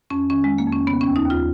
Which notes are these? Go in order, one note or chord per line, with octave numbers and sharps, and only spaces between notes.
F2 C#4
D#3 C#4
D#3 G#3
A#3
F2 C#4
C#3 B3
C#4
D#2
D#4
D#2
F4